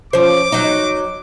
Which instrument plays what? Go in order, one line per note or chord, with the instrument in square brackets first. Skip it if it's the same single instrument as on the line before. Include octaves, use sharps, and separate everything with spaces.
[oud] F3 C#4 C5 [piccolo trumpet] D6
[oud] F#3 D#4